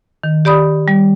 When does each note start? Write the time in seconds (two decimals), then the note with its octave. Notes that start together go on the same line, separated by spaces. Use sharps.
0.23 D#3
0.45 G4 D5 B5 D#6
0.88 G3